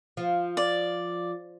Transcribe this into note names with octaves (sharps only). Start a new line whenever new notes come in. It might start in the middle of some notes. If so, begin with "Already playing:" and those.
F3
D5